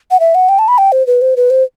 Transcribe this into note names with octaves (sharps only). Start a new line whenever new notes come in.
F#5
E5
F#5
G5
A5
B5
G5
C5
B4
C5
B4
C5